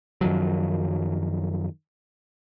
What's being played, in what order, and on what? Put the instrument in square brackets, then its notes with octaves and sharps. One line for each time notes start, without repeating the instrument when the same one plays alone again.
[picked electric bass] F#2 D#3 F3 F#3